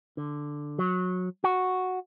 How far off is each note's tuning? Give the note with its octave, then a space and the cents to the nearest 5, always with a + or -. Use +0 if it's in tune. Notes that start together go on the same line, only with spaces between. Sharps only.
D3 +5
F#3 -20
F#4 -5